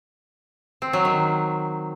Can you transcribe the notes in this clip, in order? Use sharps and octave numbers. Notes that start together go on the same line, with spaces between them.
C4
F#3
D#3